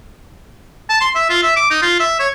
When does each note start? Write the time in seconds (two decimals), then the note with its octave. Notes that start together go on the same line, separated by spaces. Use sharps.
0.90 A5
1.01 C6
1.15 E5
1.30 F4
1.43 E5
1.56 D6
1.70 D#4
1.82 F4
2.00 E5
2.19 C#5